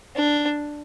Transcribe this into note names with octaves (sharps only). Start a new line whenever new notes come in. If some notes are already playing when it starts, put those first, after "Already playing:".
D4